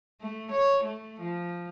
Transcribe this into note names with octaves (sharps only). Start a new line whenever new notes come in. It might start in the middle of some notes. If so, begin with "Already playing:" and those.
A3
C#5
A3
F3